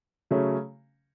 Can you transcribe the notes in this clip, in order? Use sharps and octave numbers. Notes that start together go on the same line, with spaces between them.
C#3 F#3 A3 C#4